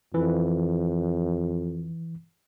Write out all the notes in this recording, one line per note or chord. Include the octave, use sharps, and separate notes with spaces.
F2 E3